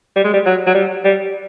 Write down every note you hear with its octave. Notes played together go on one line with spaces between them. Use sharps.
G3
G#3
G3
F#3
F#3
G3
G3